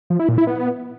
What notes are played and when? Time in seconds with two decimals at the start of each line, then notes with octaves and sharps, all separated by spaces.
0.10 F3
0.19 E4
0.29 A#2
0.38 E4
0.47 B3